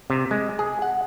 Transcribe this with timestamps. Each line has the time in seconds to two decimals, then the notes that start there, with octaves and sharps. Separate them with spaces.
0.10 C3
0.31 G#3
0.59 G#4
0.82 F#5